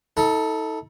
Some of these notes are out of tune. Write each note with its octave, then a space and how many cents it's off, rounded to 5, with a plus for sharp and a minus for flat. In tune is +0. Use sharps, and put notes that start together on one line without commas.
D#4 +45 A4 +5